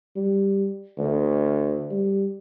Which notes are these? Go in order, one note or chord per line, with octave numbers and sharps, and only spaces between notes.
G3
D2
G3